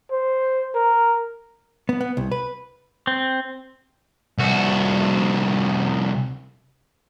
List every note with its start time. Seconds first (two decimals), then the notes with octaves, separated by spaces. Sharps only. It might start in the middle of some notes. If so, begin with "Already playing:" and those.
0.12 C5
0.75 A#4
1.89 B3
2.01 B3
2.17 C2
2.32 B4
3.07 C4
4.39 C2 F#4